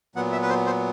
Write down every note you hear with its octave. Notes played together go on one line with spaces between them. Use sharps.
A#2 F#3 B3 F#5
E5
B4
C5
C5